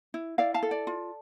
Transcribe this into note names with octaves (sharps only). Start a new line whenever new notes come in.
E4
E4 D5 F5
F5 A5
A4
D5
F4